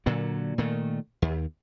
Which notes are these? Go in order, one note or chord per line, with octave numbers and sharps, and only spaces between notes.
A#2 D3 F#3
A#2 D#3 A3
D#2